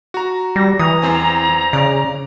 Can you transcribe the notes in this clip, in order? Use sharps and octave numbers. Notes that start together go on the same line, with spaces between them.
F#4 A#5
G3 A#6
E3 A#5 D#6
E2 C4 G#5
C#3 D5